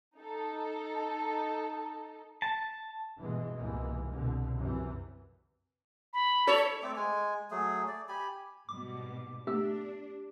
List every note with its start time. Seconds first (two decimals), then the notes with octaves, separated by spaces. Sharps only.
0.17 D#4 A4
2.42 A5
3.20 G1 B2 E3 G#3
3.57 C2 G#2 B2 E3 G#3 A#3
4.09 C2 B2 D3
4.58 F#2 C3 E3
6.13 B5
6.47 A4 C#5
6.82 A3 C4 A4 D6
6.96 G#3 G#5
7.51 F#3 A3 G#4
7.88 D5
8.09 G4 G#5 B5
8.69 G#2 B2 G3 D6
9.47 A3 B3 D4 G4 E6